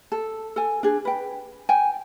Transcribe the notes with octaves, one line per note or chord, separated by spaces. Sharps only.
A4
A4 G#5
D4 G#4
B4 G5
G5 G#5